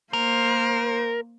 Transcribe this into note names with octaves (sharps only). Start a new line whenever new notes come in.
A#3 A#4 C5